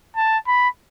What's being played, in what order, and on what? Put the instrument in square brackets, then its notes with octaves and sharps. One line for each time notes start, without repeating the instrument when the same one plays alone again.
[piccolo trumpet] A5
B5